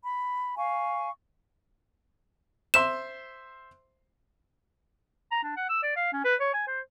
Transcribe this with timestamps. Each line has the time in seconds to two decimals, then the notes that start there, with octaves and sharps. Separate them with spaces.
0.02 B5
0.56 F5 G#5 C#6
2.74 C5 E5 C6 E7
5.31 A#5
5.43 D4
5.56 F#5
5.69 E6
5.83 D5
5.96 F5
6.13 C#4
6.25 B4
6.40 C#5
6.54 G#5
6.67 C5